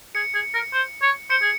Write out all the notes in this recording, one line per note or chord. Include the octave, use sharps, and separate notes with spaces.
G#4 C#7
G#4
A#4
C5
C#5
C5 C#7
G#4